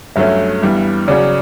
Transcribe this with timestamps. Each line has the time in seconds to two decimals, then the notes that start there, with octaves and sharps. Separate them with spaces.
0.16 G2 F#3 A3 C#4 E5
0.62 G2 E3 G3 B3
1.08 C#3 F#3 C#4 F#4 D5